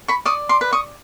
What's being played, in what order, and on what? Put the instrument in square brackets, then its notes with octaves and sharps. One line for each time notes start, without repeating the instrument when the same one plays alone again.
[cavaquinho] B5 C#6
D5 C#6 D#6
C6 D6
B4
C#6 D#6